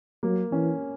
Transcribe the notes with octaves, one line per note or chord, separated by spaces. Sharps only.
F#3 A#3
E3 C#4